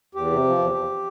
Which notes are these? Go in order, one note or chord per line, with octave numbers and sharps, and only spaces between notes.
E2 G4
C3
F3
E2
E2